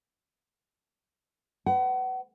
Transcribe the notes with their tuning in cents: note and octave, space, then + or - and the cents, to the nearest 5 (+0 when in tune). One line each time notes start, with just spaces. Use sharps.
B4 +25 F#5 +35